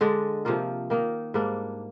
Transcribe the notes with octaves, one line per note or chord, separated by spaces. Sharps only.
D3 G#3 D4
C3 F3 A#3 F4
D#3 A#3 D#4
G#2 G3 A#3 D4